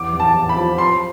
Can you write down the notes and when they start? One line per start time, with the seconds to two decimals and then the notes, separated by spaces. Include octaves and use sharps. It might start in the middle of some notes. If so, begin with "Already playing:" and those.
Already playing: E2 D6
0.13 E2
0.20 A5
0.34 E2
0.49 B5
0.57 F3
0.78 F3 C6